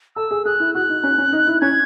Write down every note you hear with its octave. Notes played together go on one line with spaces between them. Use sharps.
A4 E6
G#4
G#4 F#6
E4
F#4 F#6
D#4
C#4
C#4
D#4
E4
C#4 G#6